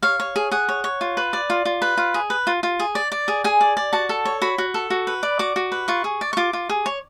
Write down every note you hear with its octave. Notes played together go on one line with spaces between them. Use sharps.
C#5 F5
C#5
G#4
G#4 F#5
C#5
C#5
F4
B4
D5
F4
F4
B4
F4
G#4
B4
F4
F4
G#4
D5
D5
G#4
G#4 G#5
D5
D5
F#4 A5
A4
C#5
F#4 B5
F#4
A4
F#4
B4
D5
F#4 D6
F#4
B4
F4 C#6
G#4
D5
C#6
F4 D6
F4
G#4
C#5